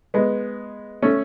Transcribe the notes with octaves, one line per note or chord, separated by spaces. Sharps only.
G#3 B3
A3 C#4